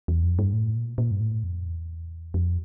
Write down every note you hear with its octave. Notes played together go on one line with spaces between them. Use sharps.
E2
F2
G2
A2
A#2
A#2
G2
A2
F2
E2
F2